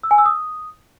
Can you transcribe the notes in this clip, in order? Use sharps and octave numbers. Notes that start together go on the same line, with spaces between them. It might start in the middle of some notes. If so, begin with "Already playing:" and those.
E6
G#5
E6
D#6